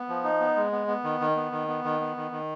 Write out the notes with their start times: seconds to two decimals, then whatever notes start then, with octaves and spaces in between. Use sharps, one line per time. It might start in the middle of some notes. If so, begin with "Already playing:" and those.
Already playing: B3
0.08 F3
0.24 D#4
0.40 B3
0.56 G#3
0.72 B3
0.87 B3
1.04 D#3
1.20 D#3
1.36 B3
1.52 D#3
1.68 B3
1.84 D#3
2.00 B3
2.16 D#3
2.31 D#3